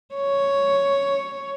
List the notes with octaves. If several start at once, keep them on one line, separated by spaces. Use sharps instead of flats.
C#5